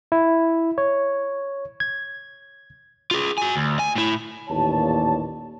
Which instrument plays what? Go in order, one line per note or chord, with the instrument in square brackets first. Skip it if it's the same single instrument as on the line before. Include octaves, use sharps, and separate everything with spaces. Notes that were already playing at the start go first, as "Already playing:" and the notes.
[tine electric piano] E4
C#5
G#6
[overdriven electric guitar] F4 G#4
F#4 G#5
D2
G#5
A2 E4
[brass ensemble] A1 D#2 A#2 C#5 A5